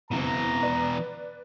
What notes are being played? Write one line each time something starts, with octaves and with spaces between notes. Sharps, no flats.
F#1 F2 B2 E3 A#5
B4 D5